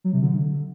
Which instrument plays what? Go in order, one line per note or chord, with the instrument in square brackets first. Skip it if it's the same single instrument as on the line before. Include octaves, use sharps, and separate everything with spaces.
[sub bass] F#3
C3
D3